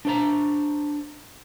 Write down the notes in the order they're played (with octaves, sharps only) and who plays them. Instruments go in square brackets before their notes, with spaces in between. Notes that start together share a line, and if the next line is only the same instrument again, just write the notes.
[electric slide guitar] D4 C5 A#5